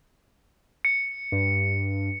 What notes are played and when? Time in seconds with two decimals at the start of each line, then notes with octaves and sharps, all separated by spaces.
0.85 C#7
1.32 G2